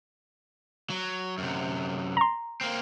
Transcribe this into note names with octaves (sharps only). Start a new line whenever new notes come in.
F#3
F#2 C3
A#5 C6
A#3 C4